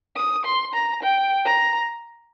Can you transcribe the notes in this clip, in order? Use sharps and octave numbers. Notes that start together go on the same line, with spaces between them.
D#6
C6
A#5
G5
A#5